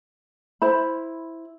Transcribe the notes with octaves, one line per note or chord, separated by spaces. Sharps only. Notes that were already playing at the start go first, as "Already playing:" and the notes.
E4 C5 B5